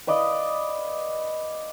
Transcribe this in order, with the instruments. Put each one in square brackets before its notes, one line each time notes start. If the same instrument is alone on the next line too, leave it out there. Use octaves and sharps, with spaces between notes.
[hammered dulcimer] B4 D5 D#5 F5